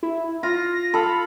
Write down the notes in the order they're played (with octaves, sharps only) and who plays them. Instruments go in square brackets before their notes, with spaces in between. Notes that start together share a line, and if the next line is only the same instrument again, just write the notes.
[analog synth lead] E4
[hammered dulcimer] F4 [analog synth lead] A#6
[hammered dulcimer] A4 F5 [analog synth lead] B5